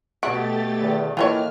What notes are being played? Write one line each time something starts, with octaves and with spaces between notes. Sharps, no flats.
B2 A3 F#4 G4 A6 D7
E2 D3 D#3
A2 D#3 E3 A#3 F4 C5 C#5 F6